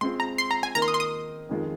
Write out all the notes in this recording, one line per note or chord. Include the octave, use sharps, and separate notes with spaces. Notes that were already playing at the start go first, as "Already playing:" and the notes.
G#3 C4 F4 C6
A#5
C6
A#5
G#5
D#3 A#3 D#4 A#4 A#5
C6
D#6
C6
D#6
F2 D#3 G#3 F4